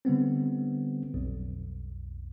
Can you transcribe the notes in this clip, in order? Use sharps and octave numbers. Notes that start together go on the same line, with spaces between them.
D3 G3 B3 C4
B1 F2